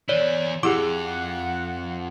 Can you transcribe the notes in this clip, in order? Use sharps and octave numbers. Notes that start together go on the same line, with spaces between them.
E2 E4 C#5 D5
F2 E4 G4 G#4 F#5 D6